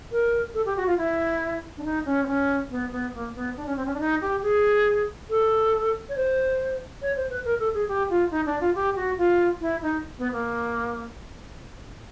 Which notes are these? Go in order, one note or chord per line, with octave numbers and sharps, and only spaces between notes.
A#4
A4
G4
F#4
F4
E4
D4
D#4
C#4
C4
C#4
B3
B3
A#3
B3
D4
C#4
C4
C#4
D4
D#4
G4
G#4
A4
C#5
C5
C#5
C5
B4
A#4
A4
G#4
G4
F4
D#4
D4
F4
G4
F#4
F4
E4
D#4
B3
A#3